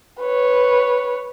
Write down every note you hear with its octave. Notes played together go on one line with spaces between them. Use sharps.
B4 C#5